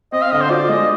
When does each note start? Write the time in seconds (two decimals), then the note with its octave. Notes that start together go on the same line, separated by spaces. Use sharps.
0.12 C4 D#5
0.22 F5
0.31 D3 D#5
0.41 C5
0.50 F4 D5
0.69 G#3 D#5